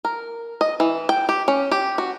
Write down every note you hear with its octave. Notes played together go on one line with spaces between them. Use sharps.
A#4
D#5
E3
G5
G4
C#4
G4
F#4